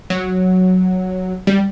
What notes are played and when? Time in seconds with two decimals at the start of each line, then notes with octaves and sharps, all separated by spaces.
0.10 F#3
1.47 G3